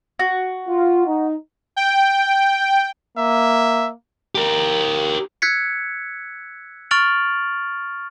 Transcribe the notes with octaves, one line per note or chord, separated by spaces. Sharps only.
F#4
F4
D#4
G5
A#3 E5
G4 A#4
E6 F#6 G#6 B6 C#7
C#6 F6 A6 D7 F7 F#7